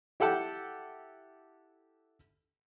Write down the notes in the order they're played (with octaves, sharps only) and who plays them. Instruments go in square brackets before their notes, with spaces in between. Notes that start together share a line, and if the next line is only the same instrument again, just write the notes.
[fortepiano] E4 G4 A4 F#5 G5 A5